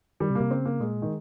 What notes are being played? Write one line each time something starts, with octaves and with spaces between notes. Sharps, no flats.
D#3 G3
C3
A#3
C3
C#3 C4
A#3
A#2 G#3
D#3